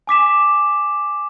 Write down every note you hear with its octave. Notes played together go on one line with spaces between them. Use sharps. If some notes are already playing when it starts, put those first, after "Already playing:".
G#5 D6 B6 E7